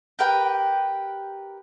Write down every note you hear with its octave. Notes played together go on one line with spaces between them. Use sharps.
G4 A#4 B4 G5